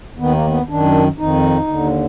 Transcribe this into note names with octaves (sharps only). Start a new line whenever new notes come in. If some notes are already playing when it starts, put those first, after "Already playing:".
D#2 D#3 B3
A#3
B3
F#2 D#3 D4
F2 D#3 D#4
D#2 D3